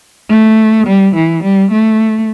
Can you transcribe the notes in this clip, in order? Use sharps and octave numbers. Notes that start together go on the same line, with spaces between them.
A3
G3
E3
G3
A3